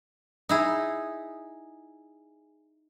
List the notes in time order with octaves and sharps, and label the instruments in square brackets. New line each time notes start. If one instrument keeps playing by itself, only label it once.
[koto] D#4 E4 G#4